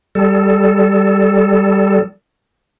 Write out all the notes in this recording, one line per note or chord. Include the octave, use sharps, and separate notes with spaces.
G3 A4